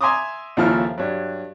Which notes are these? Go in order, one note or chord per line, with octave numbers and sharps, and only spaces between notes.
E5 G#5 A#5 C6 D6 D#6
D#2 C#3 F3 E4 A4 F6
G2 F#3